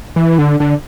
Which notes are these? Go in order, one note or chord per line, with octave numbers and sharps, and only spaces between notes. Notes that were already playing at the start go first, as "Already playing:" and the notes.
E3
D3
D3